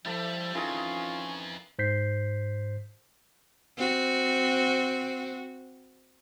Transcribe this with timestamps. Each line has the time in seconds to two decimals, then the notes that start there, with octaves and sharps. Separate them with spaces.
0.05 F3 G3 E4 G4 A4 E5
0.55 F2 D#3 E3 C#4 F4 G#4
1.79 G#2 C5 G6 B6 C7
3.77 C4 F#4